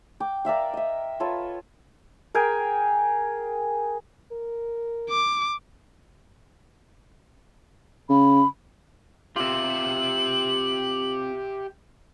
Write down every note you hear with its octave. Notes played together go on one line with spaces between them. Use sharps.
G5 D6
A#4 D5 E5 F5
D#5 E5
F4 A4 B4 C#5
G#4 A#4 G5 G#5
A#4
D6
C#3 B5
C3 F4 G4 E5 F#7